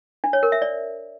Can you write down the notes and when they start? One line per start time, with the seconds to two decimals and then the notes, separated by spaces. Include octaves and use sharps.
0.24 D4
0.33 C#5
0.43 A#4
0.52 E5
0.62 D5